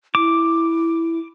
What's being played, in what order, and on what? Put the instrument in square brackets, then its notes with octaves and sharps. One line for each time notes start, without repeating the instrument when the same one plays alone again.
[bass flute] E4 [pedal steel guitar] D6